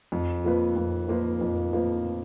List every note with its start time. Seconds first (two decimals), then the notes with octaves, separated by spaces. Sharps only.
0.12 F2
0.44 F3 A#3 F4 B4
0.76 F2
1.08 F3 A#3 F4 B4
1.41 F2
1.73 F3 A#3 F4 B4